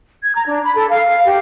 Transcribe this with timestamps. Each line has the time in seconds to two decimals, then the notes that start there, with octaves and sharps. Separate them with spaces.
0.23 G#6
0.35 A#5
0.46 D4
0.63 B5
0.75 A4
0.90 F5
1.25 G4